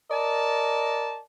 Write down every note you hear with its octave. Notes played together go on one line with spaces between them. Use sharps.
A#4 D5 D#5 A5